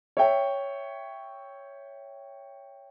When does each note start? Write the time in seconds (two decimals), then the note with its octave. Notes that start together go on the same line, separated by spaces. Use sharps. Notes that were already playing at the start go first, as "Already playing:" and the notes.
0.17 C#5 E5 G5